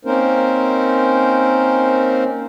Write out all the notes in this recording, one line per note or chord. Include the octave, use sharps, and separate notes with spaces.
A#3 C4 C#4 D#4 A#4 C5